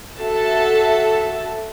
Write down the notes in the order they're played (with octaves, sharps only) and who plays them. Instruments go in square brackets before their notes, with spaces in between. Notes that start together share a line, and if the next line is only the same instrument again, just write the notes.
[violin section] F#4 A4 E5 A5